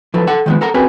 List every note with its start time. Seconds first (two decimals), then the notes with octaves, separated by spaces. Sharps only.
0.14 F3 F#3 E4 A4 B4
0.27 A4 F#5
0.46 D#3 F3 G#3 A#3 B3
0.61 A4 A#4 F#5 A#5
0.74 C4 C#4 F#4 G#4 A#4 B4